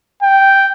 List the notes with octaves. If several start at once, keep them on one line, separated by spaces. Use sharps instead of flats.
G5